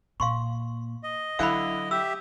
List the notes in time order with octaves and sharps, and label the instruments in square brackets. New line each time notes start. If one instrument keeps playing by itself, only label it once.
[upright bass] A#2 [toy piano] F5 C6 C#6
[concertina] D#5
[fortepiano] D3 E4 F#6 [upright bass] F#3 [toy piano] F5 G5 B5
[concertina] G4 E5 [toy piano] E6